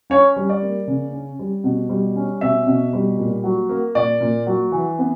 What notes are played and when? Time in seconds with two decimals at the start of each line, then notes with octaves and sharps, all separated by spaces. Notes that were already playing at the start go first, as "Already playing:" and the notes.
0.10 C#4 C#5
0.36 G3
0.49 D5
0.62 A#3
0.87 C#3
1.12 C#4
1.39 G3
1.64 B2
1.89 G3
2.16 C#4
2.41 B2 E5
2.66 B2
2.93 G3
3.18 A#2
3.44 F#3
3.69 A#3
3.95 A#2 D5
4.21 A#2
4.46 F#3
4.72 E3
4.99 B3